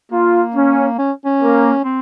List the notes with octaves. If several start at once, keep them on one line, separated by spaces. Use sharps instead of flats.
A#3 F4
C#4
C#4
C#4
A#3
C4